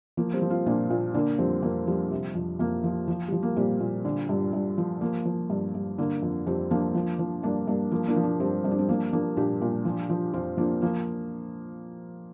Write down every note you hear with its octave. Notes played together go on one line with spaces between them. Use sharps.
F3 A#3
G3 C4
F3
C4 F4
A#2 A#3 D4
A#2
D3 A#3 D4
F2 G3 C4
F2 A#3
F3 G3
C3
F2
F2 A#3
F3
F3
F3 G3
A#3
A#2 G3 C4
A#2
D3
G2
G2
F3
F3 A#3
F3
G2
G2
D3 A#3
F2
F2 G3 C4
F3 A#3 D4
F3
F3
G2 A#3 D4
G2 A#3
F3 A#3
A#3 D4
F3
A#3 D4
G2 G3 C4
G2 C4
D4
G3 C4
F3 A#3 D4
F3 A#3 D4
A#2 D4 G4
A#2
F3
F3
F2 C4 F4
F2 A#3 D4
F3 A#3